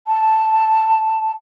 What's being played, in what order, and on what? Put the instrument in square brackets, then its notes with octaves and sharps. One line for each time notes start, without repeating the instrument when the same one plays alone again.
[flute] A5